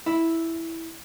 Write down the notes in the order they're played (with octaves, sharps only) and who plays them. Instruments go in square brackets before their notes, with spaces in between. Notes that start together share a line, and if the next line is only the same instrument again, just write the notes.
[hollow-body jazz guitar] E4